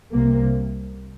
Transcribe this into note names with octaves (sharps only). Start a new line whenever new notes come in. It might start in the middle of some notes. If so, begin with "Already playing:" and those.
C2 C3 A#3